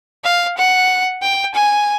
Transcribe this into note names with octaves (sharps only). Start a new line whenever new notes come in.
F5
F#5
G5
G#5